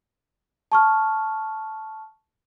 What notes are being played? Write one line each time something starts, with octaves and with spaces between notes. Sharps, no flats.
A5 C#6 F6